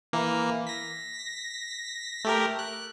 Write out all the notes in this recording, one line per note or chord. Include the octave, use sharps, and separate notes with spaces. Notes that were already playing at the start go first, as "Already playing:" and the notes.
E3 A#3
A#6 B6
A3 G4 A#4
F#6